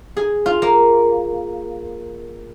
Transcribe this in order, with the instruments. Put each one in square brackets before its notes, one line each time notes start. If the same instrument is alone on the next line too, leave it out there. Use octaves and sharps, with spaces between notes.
[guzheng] G#4
F4
A#3